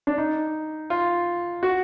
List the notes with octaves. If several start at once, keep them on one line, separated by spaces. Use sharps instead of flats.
D4
D#4
F4
F#4